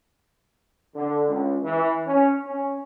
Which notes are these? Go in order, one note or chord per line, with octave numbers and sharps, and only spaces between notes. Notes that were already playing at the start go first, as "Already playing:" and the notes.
D3
C#2
E3
C#4
C#4